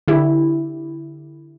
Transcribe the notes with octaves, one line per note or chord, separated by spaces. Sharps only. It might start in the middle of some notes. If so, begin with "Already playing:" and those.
D3 E4 G4